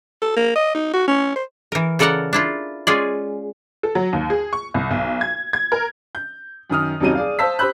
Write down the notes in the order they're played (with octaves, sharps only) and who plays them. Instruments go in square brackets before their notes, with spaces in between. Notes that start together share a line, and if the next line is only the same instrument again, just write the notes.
[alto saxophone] A4
A#3
D#5
D#4
F#4
C#4
C5
[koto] E3 A#4
C#3 A4 A#4 D5 F#5 A#5
D4 E4 F4
G#3 C#4 F4 G#4 D5
[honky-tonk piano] A4
F#3
D#2
G#4
C#6
C2
B1
G#6
G#6
A#4
[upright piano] G6
F#2 D#3 D#6 F6
D#1 F#2 C3 F#3 D#4 D#7
G#4 D5 F5
C5 F5 A5 E6 B6
G4 C5 B5 E6 F#6